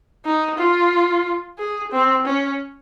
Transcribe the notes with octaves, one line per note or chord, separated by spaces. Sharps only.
D#4
F4
G#4
C4
C#4